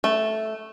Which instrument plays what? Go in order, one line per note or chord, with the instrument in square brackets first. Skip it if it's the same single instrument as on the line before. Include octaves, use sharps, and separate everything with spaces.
[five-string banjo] A3